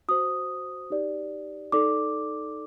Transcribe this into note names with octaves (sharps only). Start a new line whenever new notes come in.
F#4 C5 D#6
D#4 G4 D5
D#4 A4 D5 D6